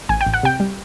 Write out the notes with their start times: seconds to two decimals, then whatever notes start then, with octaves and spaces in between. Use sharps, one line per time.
0.09 A1 G#5
0.21 G5
0.26 A1
0.34 F#5
0.43 C3 G5
0.60 G3